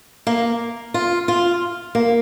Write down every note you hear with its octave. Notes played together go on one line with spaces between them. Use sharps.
A#3
F4
F4
A#3